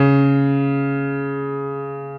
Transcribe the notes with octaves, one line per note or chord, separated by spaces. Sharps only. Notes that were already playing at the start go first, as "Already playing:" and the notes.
Already playing: C#3